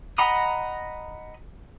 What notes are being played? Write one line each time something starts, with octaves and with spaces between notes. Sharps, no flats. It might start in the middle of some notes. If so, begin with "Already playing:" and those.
D#5 F#5 A#5 B5 D#6